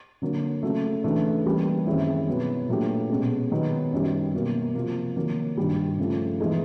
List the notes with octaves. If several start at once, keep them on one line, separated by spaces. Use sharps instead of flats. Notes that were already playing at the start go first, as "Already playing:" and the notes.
D3 F#3 A#3
C#3 F#3 A3
C#3 E3 A3 D4 F#4
E3 G3 A#3 C#4 E4
F#2 D#3 G#3 C4 E4
B2 F#3 B3
A#2 F#3 A3 D4 G4
B2 G#3 C#4
D#3 F#3 B3 D#4
F#2 D#3 G3
B2 F#3 A#3
C3 F3 A#3
D#3 F#3 A#3
G2 D#3 G3
C#3 F3 A3
E3 G#3 B3 D#4 G#4